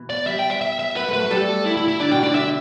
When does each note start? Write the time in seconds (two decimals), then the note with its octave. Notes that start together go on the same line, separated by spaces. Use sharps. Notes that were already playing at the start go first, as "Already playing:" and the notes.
Already playing: B2 E3
0.10 D5
0.27 G3 E5
0.39 G5
0.50 E5
0.61 E5
0.79 E5
0.96 B3 B4
1.08 A3
1.13 B4
1.19 A3
1.31 G3 A4
1.65 E4
1.77 E4
1.88 E4
2.00 D3 D5
2.12 B2 G5
2.23 D3 D5
2.35 D3 E5